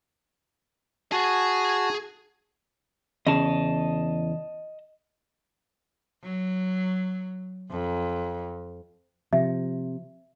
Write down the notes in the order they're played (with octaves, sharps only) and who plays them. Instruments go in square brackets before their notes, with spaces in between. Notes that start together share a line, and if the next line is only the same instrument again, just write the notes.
[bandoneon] F#4 A5 [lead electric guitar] G#4 G#5
[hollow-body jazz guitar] E2 C#3 [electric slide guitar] D#5 A5
[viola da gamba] F#3
F2
[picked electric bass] C3 [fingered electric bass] F3 [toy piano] E5